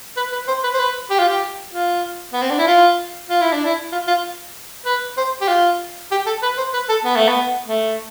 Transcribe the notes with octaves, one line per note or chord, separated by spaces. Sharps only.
B4
B4
C5
B4
C5
B4
G4
F4
G4
F4
B3
C4
D4
E4
F4
F4
E4
D4
E4
F4
F4
B4
C5
G4
F4
G4
A4
B4
C5
B4
A4
B3
A3
B3
A3